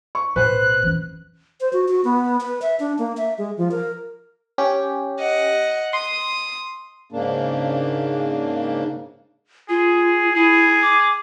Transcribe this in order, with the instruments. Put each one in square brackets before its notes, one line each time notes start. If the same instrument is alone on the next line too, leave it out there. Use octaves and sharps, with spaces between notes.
[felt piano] C#6
[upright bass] B1 A2 [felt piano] B4 C5 [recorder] F#6
[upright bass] E3 C#4
[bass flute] C5
F#4
F#4
B3
B4
E5
D4
A#3
E5
G#3
F3
A#4
[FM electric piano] C#4 G4
[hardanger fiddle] D#5 F#5
[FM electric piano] C6 [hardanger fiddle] D#6
[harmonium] G#2 C#3 A#3 D4
[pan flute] F4 [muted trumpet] G#4
[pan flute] E4 [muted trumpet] G#4
[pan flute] D6